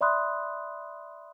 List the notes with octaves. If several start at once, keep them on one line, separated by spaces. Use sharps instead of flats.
D5 E5 B5 C6 D#6 F#6